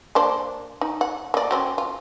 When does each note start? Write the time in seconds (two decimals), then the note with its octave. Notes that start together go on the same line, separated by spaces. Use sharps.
0.15 A#3 D4 C5
0.81 D#4
1.01 F#5
1.34 A#3 D5
1.51 F#3 C4 C#4
1.78 F4